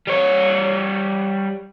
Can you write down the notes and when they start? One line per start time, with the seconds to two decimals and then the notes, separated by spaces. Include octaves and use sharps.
0.07 G3 C#5